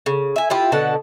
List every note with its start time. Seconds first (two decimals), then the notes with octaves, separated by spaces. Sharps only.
0.06 C#3
0.36 E5 G#5
0.50 E4 F4 G4
0.72 B2 D3 F#5 A5